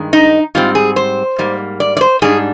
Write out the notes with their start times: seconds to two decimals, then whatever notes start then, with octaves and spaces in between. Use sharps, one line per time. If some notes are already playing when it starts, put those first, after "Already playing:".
Already playing: G2 D#3 G#3
0.13 D#4
0.55 G#2 G3 C4 F4
0.75 G#4
0.96 C5
1.38 G#2 G3 A#3
1.80 D5
1.97 D5
2.01 C5
2.22 G#2 G3 D4 G#4